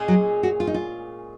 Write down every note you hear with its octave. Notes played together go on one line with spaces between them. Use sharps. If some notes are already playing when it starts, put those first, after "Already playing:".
Already playing: A#2 G#3 C#4 G#4
F#3
F#4
F4
D#4
F4